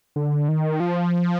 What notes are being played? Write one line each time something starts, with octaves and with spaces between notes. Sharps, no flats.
D3
D#3
F3